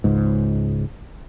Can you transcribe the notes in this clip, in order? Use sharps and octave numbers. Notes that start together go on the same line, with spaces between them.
C#2 G#2